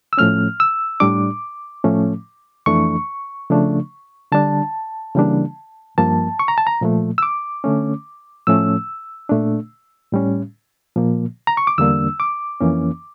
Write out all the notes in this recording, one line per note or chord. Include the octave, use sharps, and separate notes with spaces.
E6
A2 F3 A3 C#4 F6
E6
A2 G3 D4 D6
A2 F3 A3 C#4
F2 E3 A3 D4 C#6
C#3 F3 A3 D4
D3 G3 D4 A5
C#3 E3 G3 A#3 D4
G2 F3 A#3 A5
C#6
A#5
A5
A#5
A#2 F3 A3
E6
D6
D3 A3 C#4
A2 F3 A3 C#4 E6
A#2 A3 D4
A2 G3 C#4
A#2 F3 A#3
A#5
C#6
D6
E2 D3 G3 A#3 D4 E6
D6
F2 E3 A#3 C#4